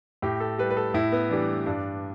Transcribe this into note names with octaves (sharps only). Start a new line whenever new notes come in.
A2 G4
A4
G3 B4
B4
A4
A2 E4
B3
E3 G3 D4
G2 D4